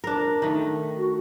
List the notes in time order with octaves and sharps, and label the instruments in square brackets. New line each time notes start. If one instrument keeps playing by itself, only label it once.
[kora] D4 A#4
D#3 A3
[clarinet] F#4